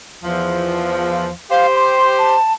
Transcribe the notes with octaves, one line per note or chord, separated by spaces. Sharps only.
E2 F3
G4 C5 F5
C6
A5